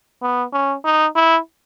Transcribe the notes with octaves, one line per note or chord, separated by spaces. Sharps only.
B3
C#4
D#4
E4